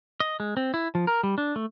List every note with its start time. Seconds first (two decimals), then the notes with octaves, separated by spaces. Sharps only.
0.20 D#5
0.40 G#3
0.57 C4
0.74 E4
0.95 F3
1.07 A#4
1.23 G3
1.38 D4
1.56 A3